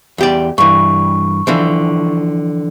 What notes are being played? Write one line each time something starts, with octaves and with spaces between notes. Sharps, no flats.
E2 G4 D5
G2 E3 C#6
D3 E3 F3